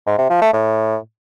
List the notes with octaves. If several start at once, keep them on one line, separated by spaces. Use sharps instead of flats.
G#2
C3
F3
A3
A2